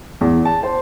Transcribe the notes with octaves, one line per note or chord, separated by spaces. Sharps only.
E2
A5
C5